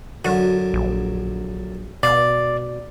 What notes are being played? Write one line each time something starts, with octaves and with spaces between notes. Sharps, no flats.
F#2 D3 F#4
A#1
B2 D5 F5